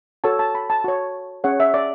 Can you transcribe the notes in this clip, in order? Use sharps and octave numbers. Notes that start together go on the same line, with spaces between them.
F#4 A4 C#5 A5
A5
B5
A5
F#4 C#5
C#4 G#4 C#5 F#5
E5
D5